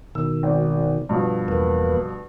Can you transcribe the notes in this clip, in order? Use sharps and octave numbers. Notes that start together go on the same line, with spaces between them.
B2 D#3 E6
G#1
G2 B2 F3
E2 A#3 B4